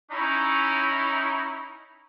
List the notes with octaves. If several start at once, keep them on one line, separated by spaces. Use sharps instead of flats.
C#4 D#4 E4 A#5